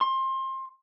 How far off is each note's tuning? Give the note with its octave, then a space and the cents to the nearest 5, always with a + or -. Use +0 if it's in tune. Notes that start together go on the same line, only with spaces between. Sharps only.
C6 +25